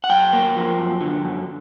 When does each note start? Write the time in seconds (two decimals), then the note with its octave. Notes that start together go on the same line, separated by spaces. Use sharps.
0.04 F#5
0.09 F#2 G5
0.33 A#3
0.56 F3
0.79 F#2
1.01 D3
1.24 F#2